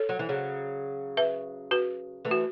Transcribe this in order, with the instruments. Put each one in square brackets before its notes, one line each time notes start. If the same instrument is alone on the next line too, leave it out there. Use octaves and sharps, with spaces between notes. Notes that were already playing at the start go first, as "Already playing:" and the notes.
Already playing: [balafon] A4 C#5
[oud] F#3
E3
C#3 F#3
[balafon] B4 E5
F#4 B4
[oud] E3 A3
[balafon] F#4